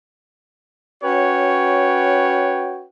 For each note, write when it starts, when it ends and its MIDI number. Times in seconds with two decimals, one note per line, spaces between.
1.04 2.85 61
1.04 2.85 66
1.04 2.85 71
1.04 2.85 73
1.04 2.85 79